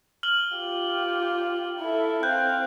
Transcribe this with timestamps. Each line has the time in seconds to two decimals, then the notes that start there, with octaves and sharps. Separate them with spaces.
0.23 F6 F#7 G7
0.55 F4 G4
1.79 E4 A4
2.23 C4 F5 F#6 G6